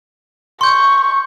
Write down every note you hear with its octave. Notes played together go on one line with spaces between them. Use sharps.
C6 C#6 G6